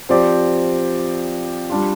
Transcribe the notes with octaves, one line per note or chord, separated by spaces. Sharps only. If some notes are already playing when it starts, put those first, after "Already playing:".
F3 C4 G4 D5
G3 D4 F4